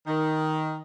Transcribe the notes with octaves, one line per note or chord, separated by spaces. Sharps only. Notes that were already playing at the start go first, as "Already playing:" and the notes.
D#3